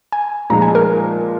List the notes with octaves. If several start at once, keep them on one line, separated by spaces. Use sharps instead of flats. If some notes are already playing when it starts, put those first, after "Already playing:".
G#5
A#2 F3 G#3 D#4 A#5
G#5
A#4